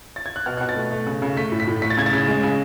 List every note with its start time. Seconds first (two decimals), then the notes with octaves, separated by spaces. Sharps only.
0.16 A6
0.26 G#6
0.36 F#6
0.46 B2 F6
0.57 B2 F#6
0.69 A6
0.76 A3
0.91 A3
1.07 C#3
1.22 C#3
1.36 A3 B6
1.52 A2
1.60 B6
1.68 A2
1.82 A3 B6
1.90 A6
1.97 C#3 G#6
2.06 A6
2.13 C#3
2.28 G#3
2.43 C#3